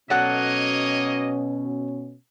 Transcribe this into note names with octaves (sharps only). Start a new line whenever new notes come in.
B2 F#3 A#3 C#4 A4 C#5 D#5 F#5